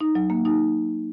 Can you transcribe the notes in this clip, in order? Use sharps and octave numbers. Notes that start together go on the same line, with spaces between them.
D#4
F#3
A#3
D#4